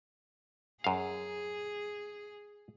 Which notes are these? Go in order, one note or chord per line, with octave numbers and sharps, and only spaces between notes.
F#2 G#4 F5